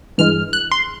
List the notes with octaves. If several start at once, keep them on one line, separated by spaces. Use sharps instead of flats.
G2 E3 G#3 F6
F#6
C6